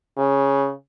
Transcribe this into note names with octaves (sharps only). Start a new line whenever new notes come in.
C#3